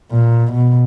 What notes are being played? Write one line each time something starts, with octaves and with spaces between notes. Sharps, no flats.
A#2
B2